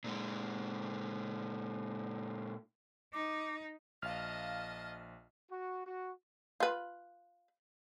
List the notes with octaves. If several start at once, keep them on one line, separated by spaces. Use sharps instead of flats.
A#2 G#3
D#4 D6
A#1 D#5 F5 A5 F6
F#4
F#4
F4 B4